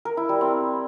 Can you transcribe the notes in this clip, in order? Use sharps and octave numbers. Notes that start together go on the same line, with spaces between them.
A#4
E4
G3
C4